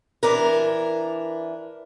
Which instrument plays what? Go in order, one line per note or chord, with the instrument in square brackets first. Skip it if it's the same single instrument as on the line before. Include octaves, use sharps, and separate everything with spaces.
[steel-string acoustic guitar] E3 D4 A#4